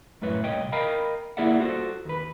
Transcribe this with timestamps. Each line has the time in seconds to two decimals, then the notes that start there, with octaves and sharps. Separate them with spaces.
0.22 F#2 A2 A3 B4 C#5
0.43 C2 A#2 C#5 D#5 G5
0.72 A#4 D#5 F5 G5 A#5 B5
1.37 A#3 E4 G#4 D5 E5 F#5
1.60 F4 F#4 A4 C5
2.05 D#2 B4